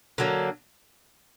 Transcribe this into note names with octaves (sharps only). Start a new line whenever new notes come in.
D3 F#3 A#3